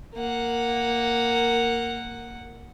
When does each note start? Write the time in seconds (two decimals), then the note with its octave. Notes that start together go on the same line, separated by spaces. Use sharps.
0.16 A#3 F#5